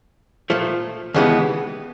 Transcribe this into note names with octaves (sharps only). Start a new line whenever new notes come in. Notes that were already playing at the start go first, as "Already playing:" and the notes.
A#2 F3 A3
D#2 C#3 E3 G#3 B3